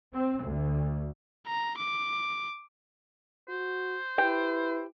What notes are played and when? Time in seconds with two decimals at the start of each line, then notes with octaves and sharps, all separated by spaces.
0.14 C4
0.44 D2
1.47 A#5
1.78 D6
3.49 F#4 C5
4.18 E4 G4 B4 G5